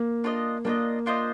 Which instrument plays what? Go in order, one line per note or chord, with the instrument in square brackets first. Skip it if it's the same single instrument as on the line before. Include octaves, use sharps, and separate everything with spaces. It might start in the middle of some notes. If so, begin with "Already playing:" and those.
Already playing: [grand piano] A#3
[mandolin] D4 F4 C5 D#5
[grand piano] A#3 [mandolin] D4 F4 C5 D#5
[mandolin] D4 F4 C5 D#5